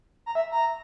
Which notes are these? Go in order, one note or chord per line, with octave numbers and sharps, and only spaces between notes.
A#5
E5
A#5